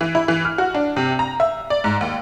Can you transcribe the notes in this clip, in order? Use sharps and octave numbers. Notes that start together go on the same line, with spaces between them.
E3
E4
E3
F6
F#4
D4
C3
A#5
E5
D5
G#2
D#2